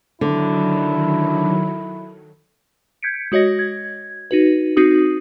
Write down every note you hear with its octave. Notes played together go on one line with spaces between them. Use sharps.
D3 D#3 F#3 E4
G6 G#6 B6 C#7 D7
G#3 F#4 C#5 D#5 A#6
G#6
D#4 F#4 B4
C4 D#4 F#4 D#6